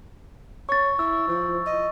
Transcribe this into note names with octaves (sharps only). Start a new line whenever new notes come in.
C#5 C#6 A6
E4 E6
F3
D#5